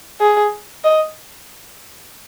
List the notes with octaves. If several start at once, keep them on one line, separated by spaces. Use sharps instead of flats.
G#4
D#5